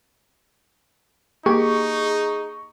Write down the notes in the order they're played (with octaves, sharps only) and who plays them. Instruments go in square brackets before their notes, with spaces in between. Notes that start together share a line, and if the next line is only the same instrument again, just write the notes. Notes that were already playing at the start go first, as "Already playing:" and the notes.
[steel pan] A#3 G4 [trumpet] D#4 [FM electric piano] G#4 [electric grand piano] C#6